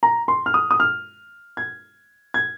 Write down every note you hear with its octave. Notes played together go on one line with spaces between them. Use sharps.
A#5
C6
F6
D#6
D#6
F6
G#6
G#6